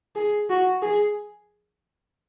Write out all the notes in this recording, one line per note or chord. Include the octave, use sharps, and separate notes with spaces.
G#4
F#4
G#4